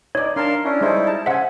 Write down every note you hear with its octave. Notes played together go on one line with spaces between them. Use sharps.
D#4 C#5 D5
D4 A#4 F5 A5 C6
C#4 D4 E4
G3 G#3 D#4 E4 C5 G#5
A5
C#3 C5 E5 F#5 G#5